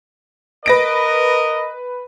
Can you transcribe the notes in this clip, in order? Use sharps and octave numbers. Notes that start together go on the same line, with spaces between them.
A#4 B4 D#5 A#6 D7